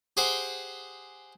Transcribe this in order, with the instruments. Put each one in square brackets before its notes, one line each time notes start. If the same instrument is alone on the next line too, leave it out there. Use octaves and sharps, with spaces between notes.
[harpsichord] G4 G#4 C5 F#5 G5